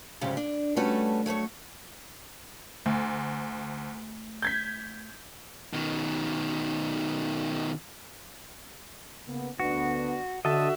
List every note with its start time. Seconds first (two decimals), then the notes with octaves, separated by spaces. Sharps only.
0.21 D2 G#2 C#3 F#3 G3 G4
0.37 D4
0.76 G3 A3 C#4 F#4 A4 B4
1.26 F#3 A3 C5 C#5
2.86 D2 A3
4.42 G6 G#6 B6
5.73 B2 D#3
9.27 C#3 A#3 B3
9.60 D2 B3 D4 F#4
10.45 D3 F#4 D#5 E5 A5